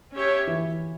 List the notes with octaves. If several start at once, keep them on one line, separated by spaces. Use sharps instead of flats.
C#4 G4 C#5 E5
E3